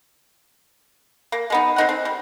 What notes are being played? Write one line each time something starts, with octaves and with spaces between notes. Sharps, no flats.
A#3
G#3 B3 D#4
C4 D#4 F#5
C4
G3